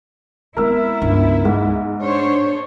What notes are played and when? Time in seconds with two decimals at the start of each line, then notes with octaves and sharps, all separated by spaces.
0.57 G#3 B3 C4 E4 A#4 E6
1.02 C#2 G2
1.45 G#2 A#3
2.02 D4 C5 C#5